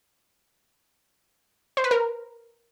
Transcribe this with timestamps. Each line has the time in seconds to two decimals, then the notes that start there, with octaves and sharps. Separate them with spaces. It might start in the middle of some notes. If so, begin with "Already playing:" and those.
1.77 C5
1.84 B4
1.91 A#4